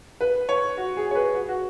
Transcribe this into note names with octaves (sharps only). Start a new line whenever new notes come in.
B4
C#5
F#4
G#4
C#5
B4
F#4
F#4